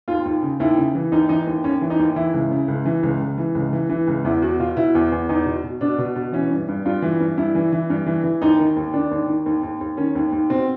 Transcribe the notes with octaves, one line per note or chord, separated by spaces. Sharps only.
D#2 F4
D#2
C#3
D#2 E4
C#3
E3
D#2 D#4
E3 D#4
D#2
D#2 C#4
E3
D#4
D#2
E3 E4
C#2
C#3
C#2
E3
C#2
C#2
E3
C#2
E3
E3
C#2
E2 E4
E2 F#4
B2 F4
B2 E4
E2
E2
E2 D#4
B2
B2
B2 D4
B2
B2
E3 C#4
G2
G2
G2 F4
E3
G2
G2 E4
E3
E3
G2
E3
E3
D#2 D#4
D#3
D#2
D#3 D4
D#2
D#3
D#2
D#2
D#2
D#3 C#4
D#2
D#2
B2 C4